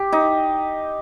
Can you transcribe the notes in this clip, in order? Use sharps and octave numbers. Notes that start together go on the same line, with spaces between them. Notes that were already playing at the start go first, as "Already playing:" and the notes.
Already playing: G4
D#4